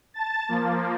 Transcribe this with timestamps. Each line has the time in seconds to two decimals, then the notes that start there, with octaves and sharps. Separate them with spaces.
0.14 A5 A6
0.49 F3 A#3